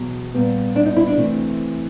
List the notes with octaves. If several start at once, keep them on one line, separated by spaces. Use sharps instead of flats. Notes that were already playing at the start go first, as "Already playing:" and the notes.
Already playing: E2 B2 F#3
A#2 G3 B3
D4
D#4
E4
D4
C3 E3 A3